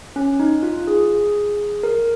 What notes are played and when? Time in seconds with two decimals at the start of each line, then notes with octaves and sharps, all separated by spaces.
0.16 C#4
0.40 D#4
0.63 F4
0.87 G#4
1.83 A#4